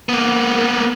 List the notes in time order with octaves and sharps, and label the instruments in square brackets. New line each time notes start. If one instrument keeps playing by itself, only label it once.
[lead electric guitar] A#3 B3